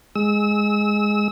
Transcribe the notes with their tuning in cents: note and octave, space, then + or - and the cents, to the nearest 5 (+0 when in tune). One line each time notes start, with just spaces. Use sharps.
G#3 +0 E6 -30